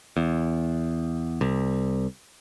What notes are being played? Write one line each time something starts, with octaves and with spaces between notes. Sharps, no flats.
E2
C2